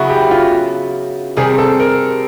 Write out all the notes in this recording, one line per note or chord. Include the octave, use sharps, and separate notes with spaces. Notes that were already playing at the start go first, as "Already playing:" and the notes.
Already playing: C#3 F#3 B3 E4 F#4
G4
F4
C3 D#3 G3 C4 G#4
A4
A#4